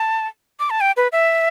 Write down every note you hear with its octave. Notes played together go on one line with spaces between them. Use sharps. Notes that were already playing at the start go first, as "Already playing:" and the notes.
Already playing: A5
D6
A5
G5
B4
E5